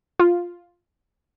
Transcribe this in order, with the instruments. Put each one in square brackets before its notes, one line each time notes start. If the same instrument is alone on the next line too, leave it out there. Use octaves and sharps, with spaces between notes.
[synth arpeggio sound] F4